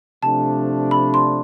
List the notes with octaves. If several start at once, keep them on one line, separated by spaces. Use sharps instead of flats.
C3 F3 A3 D4 A5
B5
C6